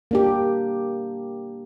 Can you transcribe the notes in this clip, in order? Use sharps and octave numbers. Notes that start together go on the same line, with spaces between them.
A#3 D4 G4